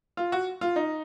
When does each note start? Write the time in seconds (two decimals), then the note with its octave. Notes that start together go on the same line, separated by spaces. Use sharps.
0.17 F4
0.32 F#4
0.61 F4
0.76 D#4